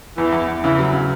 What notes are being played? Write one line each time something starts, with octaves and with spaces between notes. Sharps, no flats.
E2 E3
E2
E2
C#3 E3
F#3
C#3